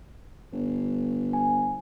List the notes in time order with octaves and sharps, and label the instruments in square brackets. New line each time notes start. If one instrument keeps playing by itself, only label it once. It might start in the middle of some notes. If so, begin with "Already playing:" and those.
[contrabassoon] G1
[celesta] G#5